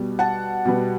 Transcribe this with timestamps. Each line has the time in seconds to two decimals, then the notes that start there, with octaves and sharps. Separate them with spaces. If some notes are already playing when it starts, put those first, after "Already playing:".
Already playing: B2 G3 B3
0.19 F#5 A5
0.65 B2 G3 B3